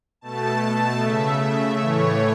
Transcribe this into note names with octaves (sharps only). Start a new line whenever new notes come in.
B2 A3 A5
C#3 A3 E5
A2 E3 A3 C#5